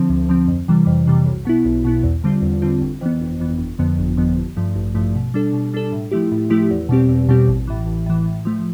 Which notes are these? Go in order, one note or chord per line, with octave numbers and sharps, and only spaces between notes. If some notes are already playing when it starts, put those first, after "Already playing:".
Already playing: D3 F3 C4
D2
D3 F3 C4
F2
C3 E3 G3
F2
C3 E3 G3
B1
B2 B3 E4
B1
B2 B3 E4
E2
D3 G3 C4 F4
E2
D3 G3 C4 F4
G1
F2 E3 B3
G1
F2 E3 B3
G1
F2 D3 F3 B3
G1
F2 D3 F3 B3
A1
G2 F3 A3
A1
G2 F3 A3
B2
G3 D4 A4
B2
G3 D4 A4
A2
F3 A3 E4 G4
A2
F3 A3 E4 G4
E2
B2 G3 C4 G4
E2
B2 G3 C4 G4
A1
A2 E3
A1
A2 E3
A2
F3 A3